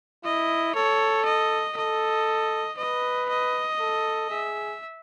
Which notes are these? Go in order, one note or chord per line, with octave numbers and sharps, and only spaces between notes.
E4 D#5
A4 C#5
D#5
A4 D#5
B4 D#5
D#5
A4
G#4 E5